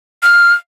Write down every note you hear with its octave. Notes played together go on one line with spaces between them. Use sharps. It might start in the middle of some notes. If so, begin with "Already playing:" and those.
F6